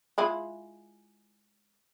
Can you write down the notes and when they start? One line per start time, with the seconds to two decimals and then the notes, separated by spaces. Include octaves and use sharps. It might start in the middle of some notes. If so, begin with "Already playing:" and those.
0.18 G#3 E4 F4